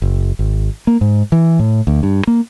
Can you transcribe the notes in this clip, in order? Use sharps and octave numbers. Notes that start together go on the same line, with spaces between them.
F#1
G#1
A#3
G#2
E3
A2
D2
G2
A#3